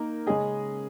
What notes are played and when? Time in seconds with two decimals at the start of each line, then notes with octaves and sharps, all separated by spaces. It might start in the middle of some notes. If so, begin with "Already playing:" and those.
Already playing: A#3 D#4 A#4
0.27 C#3 G#3 C#4 G#4 D#5